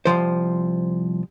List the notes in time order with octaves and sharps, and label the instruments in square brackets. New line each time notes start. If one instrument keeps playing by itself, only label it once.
[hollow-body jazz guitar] C2 C#3 F3 C5